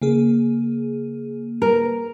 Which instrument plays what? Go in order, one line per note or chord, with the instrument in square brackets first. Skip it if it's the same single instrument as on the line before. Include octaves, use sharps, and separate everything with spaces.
[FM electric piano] C#3 A#3 G#4
[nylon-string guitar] A#4